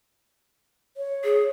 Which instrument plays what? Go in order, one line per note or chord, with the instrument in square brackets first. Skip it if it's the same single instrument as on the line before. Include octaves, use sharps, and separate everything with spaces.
[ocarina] C#5
[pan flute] G#4